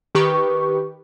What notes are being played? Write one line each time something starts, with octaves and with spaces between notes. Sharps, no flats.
D#3 G4 B4 C#6